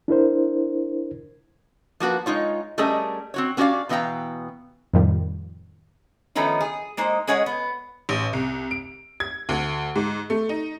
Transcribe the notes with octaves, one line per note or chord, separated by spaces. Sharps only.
D4 E4 A#4 C5
F3 A#3 F#4 B4
G#3 D#4 F4 C#5
G3 A3 C#4 G#4 A#4 D#5
C4 F#4 C#5
B3 C#4 F#4 G4 D5 F5
B2 E3 B3 F5 G5 A#5
F2 A2 D#3 F3 G3
D#3 F3 A3 B3 C#4 D#4
G#4
G#3 A#3 D#4 C5
G#3 C#4 G#4 C#5 D#5 F#5
B3
A1
C2
D7
G#6
D2
G#2
A3
D#4